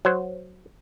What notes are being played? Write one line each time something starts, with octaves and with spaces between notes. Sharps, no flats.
F#3 C5